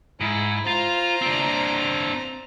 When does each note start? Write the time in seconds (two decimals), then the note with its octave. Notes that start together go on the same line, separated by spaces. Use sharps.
0.20 G#2 E4
0.67 F4 C5 A#5
1.22 C4 D4